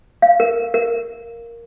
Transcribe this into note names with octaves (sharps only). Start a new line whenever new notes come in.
F5
A#4
A#4